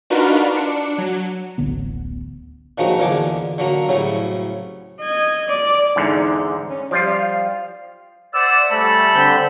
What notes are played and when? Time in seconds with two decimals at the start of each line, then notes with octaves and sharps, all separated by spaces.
0.10 D4 D#4 F4 F#4 A#4 B4
0.54 D4 C#7
0.98 F#3
1.58 D1 A1 D3 B3
2.78 A#2 D#3 F3 F#3 G#3 A#3
2.98 E2 A#2 D3 G#3 G#5 D6
3.58 D3 F#3 A#3 A#5
3.89 C2 A2 C#3 F#3
5.01 D#5 G#6
5.48 D5
5.96 E2 G#2 D3 D#4
6.70 C#4
6.91 F3 G3 F4 D5
7.07 F5
8.34 C5 D5 E5 F#5 E6
8.71 G3 A3 C#4 A4 B5
9.15 D3 C4 G6